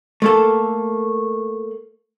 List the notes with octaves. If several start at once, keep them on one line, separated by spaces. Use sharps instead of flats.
A3 A#3 A4